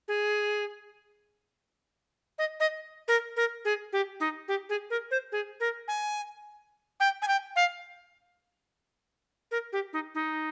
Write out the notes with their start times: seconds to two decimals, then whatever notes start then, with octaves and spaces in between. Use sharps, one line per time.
0.08 G#4
2.38 D#5
2.60 D#5
3.08 A#4
3.37 A#4
3.65 G#4
3.93 G4
4.20 D#4
4.48 G4
4.69 G#4
4.90 A#4
5.11 C5
5.32 G#4
5.60 A#4
5.88 G#5
7.00 G5
7.22 G#5
7.28 G5
7.56 F5
9.51 A#4
9.73 G4
9.93 D#4
10.15 D#4